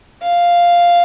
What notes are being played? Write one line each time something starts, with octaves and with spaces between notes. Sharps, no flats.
F5